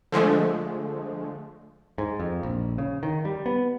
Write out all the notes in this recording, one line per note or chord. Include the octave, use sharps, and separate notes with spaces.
D3 F3 G#3 A3
G#2
F2
A#1
C#3
D#3
G3
B3